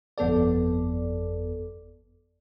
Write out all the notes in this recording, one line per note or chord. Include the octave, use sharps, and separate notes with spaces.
G1 F2 B3 A4 D5